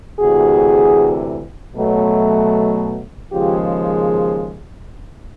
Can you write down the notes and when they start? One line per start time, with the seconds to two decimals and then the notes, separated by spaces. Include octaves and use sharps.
0.20 D2 C3 E3 F#4 G#4
1.76 B2 F#3 A3
3.32 D#2 C#3 F3 G#3 F4 G4